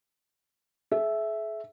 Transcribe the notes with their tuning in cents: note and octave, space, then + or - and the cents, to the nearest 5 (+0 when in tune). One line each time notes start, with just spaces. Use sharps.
G#4 +45 E5 +0